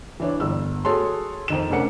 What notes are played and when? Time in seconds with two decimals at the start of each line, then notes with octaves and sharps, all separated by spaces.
0.20 E3 D4 C#5
0.40 G1 E6
0.85 F#4 G#4 A4 C#5 A5 C6
1.48 F2 D#3 E7
1.71 F1 C#4 D4 A#4 F#5 C#7